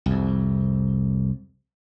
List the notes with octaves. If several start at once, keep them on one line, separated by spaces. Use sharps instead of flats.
C2 F2